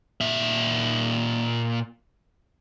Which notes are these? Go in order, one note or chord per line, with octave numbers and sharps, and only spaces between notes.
A#2 E5